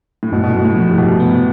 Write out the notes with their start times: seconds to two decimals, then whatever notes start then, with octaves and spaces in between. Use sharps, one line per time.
0.23 A2
0.32 G2 B2
0.43 B2
0.49 A2
0.54 G2
0.65 A2
0.76 F3
0.81 A2
0.90 C3
0.98 G2 B2
1.20 B3